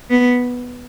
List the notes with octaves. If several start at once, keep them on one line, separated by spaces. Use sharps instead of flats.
B3